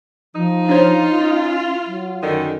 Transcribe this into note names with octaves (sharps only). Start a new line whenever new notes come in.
F3 D#4
D4 F4 C5 C#5
C#4
F#3
F#2 D3 D#3